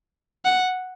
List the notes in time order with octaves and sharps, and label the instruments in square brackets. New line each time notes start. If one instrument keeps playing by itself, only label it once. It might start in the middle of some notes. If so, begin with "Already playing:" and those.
[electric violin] F#5